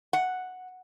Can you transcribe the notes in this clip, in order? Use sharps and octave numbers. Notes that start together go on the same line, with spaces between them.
F#5